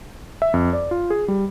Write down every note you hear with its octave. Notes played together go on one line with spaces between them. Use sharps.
E5
F2
D5
F4
G#4
G3